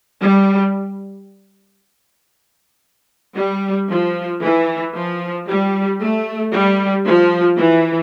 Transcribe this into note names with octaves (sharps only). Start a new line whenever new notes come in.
G3
G3
F3
E3
F3
G3
A3
G3
F3
E3